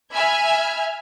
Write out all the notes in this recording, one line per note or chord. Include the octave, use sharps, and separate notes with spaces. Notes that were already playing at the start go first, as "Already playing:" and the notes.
E5 G#5 B5 F6 G#6